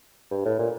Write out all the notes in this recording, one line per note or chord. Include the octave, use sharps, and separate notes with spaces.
G2
A2
A#2